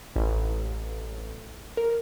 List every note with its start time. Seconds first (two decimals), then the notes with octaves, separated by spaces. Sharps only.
0.16 A1
1.77 A#4